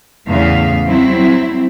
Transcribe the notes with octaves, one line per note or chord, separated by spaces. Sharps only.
E2 A2 C#3 B3 E5 F5
F#3 G3 C4 E4